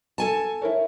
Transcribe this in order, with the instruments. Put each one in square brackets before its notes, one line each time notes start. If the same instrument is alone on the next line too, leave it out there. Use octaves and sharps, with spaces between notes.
[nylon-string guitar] A4 G#5 A5
[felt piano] E4 A#4 C#5